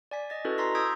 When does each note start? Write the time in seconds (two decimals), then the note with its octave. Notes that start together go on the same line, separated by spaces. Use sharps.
0.11 D5 G#5 B6
0.30 D#5 A6
0.45 C#4 E4 F#4 A4 B4 D#5
0.58 A#5 C6 A#6 B6
0.75 D#6 E6 G6 G#6 B6 D7